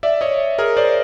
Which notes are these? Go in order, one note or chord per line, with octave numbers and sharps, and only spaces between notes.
D5 E5
C#5 D#5
G#4 A#4
C5 D5